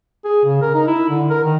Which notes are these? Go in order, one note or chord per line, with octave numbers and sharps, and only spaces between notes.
G#4
C#3
A#4
D#4
E4
D3
A#4
D#3